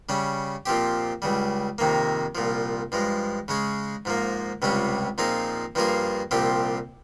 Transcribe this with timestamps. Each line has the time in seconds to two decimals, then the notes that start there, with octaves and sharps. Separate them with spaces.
0.09 C#3 G3 C#4
0.66 A#2 F3 C4 G4
1.22 C#2 C#3 G3
1.78 F2 C3 D#3 A#3
2.35 C2 A#2 F3
2.92 G2 F3 G#3
3.48 C#3 G#3 C#4 G#4
4.05 G#2 F3 A#3
4.62 C#2 C3 G3 C#4 F4
5.18 A#2 F3 C4 D#4 G#4
5.75 G2 F3 A#3 F4 G#4
6.31 C2 A#2 F3 C4 G4